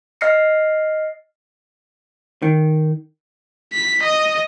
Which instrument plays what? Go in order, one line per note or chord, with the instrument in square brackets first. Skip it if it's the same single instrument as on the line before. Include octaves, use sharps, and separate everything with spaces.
[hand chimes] D#5 F6 A#6 C7 C#7
[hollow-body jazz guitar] D#3
[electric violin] B6
D#5